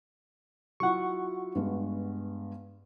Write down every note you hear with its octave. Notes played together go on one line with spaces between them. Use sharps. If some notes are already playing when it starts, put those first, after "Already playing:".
F#3 E4 F4 F#5 C#6
G2 G#3 B3